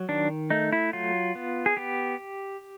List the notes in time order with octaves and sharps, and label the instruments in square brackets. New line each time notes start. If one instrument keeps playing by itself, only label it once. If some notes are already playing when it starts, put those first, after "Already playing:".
Already playing: [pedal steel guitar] F#3
D#3 D4
A3 D#4
E4
F#3 F4
B3
G#4
B3 G4